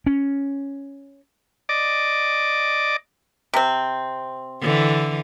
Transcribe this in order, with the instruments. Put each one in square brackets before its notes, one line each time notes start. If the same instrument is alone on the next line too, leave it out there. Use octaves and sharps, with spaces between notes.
[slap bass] C#4
[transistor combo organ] D5 D#5 D6
[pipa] C3 C4
[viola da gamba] D3 E3